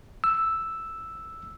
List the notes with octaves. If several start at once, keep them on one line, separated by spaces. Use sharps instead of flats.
E6